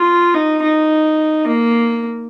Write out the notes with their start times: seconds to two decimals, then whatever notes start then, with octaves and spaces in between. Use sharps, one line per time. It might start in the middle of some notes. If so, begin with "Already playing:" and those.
Already playing: F4
0.34 D#4
0.62 D#4
1.47 A#3